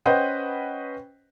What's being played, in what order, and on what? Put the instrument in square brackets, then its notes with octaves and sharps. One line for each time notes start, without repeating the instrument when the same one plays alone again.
[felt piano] C#4 B4 C5 D#5 F#5 G5